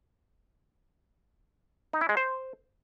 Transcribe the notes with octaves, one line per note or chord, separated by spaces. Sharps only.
D#4
E4
G#3
C5